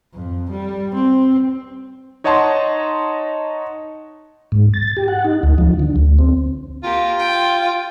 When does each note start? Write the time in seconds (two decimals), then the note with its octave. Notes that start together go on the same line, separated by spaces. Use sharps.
0.13 F2
0.50 G3
0.94 C4
2.24 D#4 C#5 D#5 F#5 A5 C6
4.52 G#2
4.74 A6
4.97 G4
5.08 F#5
5.24 D#4
5.43 D2
5.58 F3
5.79 D3
5.96 D2
6.19 C4
6.84 A#3 F4 G4
7.19 G5